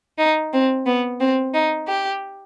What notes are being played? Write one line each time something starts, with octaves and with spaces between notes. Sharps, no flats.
D#4
C4
B3
C4
D#4
G4